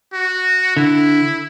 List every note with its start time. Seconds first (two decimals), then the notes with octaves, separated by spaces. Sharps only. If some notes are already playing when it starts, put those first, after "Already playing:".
0.13 F#4
0.77 D3 E4